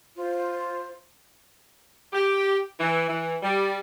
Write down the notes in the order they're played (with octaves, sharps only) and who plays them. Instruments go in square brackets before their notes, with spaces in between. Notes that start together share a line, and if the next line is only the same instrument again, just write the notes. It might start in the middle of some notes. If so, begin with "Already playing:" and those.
[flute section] F4 C5
[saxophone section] G4
E3
E3
G3